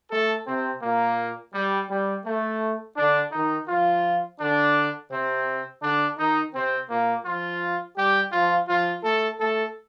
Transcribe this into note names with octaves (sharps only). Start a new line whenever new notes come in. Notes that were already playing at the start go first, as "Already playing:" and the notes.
A3 A4
C3 C4
A#2 A#3
G3
G3
A3
D3 D4
D#3 D#4
F3 F4
D3 D4
C3 C4
D3 D4
D#3 D#4
C3 C4
A#2 A#3
F3 F4
G3 G4
F3 F4
F3 F4
A3 A4
A3 A4